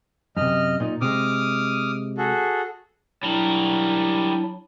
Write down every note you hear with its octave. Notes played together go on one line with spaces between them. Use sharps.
F#2 C3 D#5 F6
A#2 D#4
C3 G#3 D6 D#6 F6
F#4 G#4 A4
F#3 G3 D4 E4 A#4